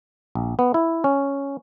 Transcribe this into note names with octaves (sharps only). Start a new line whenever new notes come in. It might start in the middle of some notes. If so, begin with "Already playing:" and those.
A#1
B3
E4
C#4